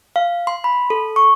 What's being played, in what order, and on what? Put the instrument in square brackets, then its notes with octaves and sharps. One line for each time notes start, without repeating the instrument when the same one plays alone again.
[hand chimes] F5
C6
B5
A4
C#6